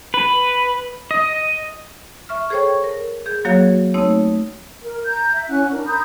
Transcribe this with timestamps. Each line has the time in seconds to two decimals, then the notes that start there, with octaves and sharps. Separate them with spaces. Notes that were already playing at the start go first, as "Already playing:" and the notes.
0.14 B4
1.11 D#5
2.29 E5 C#6 F6
2.50 G#4 A4 C5 C#5 G5 C#6
2.84 A#4
3.26 G#4 G6
3.45 F#3 A#3 F#4 G#4 C#5 F5
3.94 A3 C4 D#4 C#5 D#6 E6
4.82 A#4
5.06 A#5 G6
5.33 E5
5.48 C#4 E4 F#5 F#6
5.71 D4 A#4
5.87 A#5 B5 D#6 G6